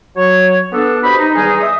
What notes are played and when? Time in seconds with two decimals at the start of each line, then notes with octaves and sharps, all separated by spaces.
0.16 F#3 C#5
0.72 B3 D4 A4
1.03 B2 G4 C5 D#5 B5
1.18 D#4
1.34 E2 D#3 G3 G#3 D#4 G#4
1.60 D#5 E5 D#6